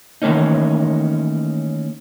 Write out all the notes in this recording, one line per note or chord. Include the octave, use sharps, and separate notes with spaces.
D#3 E3 A3 A#3 C#4 D#4